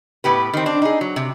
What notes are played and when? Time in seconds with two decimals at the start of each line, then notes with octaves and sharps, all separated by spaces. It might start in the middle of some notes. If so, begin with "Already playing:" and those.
0.24 A2 B3 G4 B4
0.54 D#3 C4
0.66 C4 D4
0.82 D#4 G#4
1.01 F#3
1.16 C3